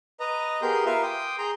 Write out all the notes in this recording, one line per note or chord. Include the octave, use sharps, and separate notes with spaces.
B4 D#5 A#5
B3 G4 G#4 A#4 C6 G6
F4 A#4 B4 E5
G5 C6 D6 D#6
G#4 A#5 C6 G6